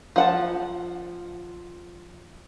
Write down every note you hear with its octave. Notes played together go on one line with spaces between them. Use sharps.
F3 F#5 A5